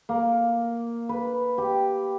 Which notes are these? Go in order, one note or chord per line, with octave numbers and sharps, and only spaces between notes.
A#3
B4
G4